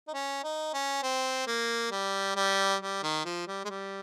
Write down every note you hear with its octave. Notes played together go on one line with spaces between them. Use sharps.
D#4
C#4
D#4
C#4
C4
A#3
G3
G3
G3
D#3
F3
G3
G#3
G3